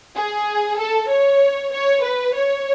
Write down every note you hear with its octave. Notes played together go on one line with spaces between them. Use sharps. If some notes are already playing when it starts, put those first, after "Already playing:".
G#4
A4
C#5
C#5
B4
C#5